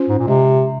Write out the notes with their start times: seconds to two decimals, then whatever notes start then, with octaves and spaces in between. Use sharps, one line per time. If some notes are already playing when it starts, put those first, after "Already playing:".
Already playing: C#4 F4 C5
0.09 G#2
0.19 A#2
0.27 C3 G#3